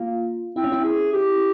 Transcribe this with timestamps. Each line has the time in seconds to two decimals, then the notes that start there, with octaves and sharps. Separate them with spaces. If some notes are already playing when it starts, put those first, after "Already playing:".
Already playing: A#3 F4
0.56 C4 E4
0.64 C#4
0.72 E4
0.84 G#4
1.13 G4